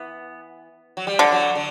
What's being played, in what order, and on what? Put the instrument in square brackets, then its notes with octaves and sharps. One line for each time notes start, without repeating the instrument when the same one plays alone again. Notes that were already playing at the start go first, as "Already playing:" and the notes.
Already playing: [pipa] E3 [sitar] B3
[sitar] F#3
G3
[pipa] D3
[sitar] F#3
D3